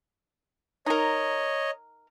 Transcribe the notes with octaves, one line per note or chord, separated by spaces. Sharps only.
D#4 A#4 C#5 D#5